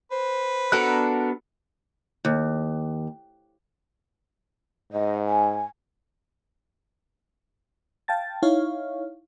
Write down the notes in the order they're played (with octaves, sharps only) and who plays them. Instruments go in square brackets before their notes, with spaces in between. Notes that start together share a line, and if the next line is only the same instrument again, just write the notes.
[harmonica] B4 [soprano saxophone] C5
[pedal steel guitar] B3 D4 F#6 [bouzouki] F#4 A4 A#4
[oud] D#2
[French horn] G#2 [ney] D#5
[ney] G#5
[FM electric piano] F5 G5 A5 A6
D#4 E4 C#5 F5